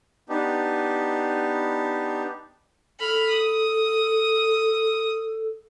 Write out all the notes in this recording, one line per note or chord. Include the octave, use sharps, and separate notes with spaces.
B3 D4 D#4 G4
A4 B5 F6
D#6